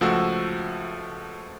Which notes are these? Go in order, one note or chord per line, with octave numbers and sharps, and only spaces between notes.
C#2 F3 A3 F#4 F#5 E6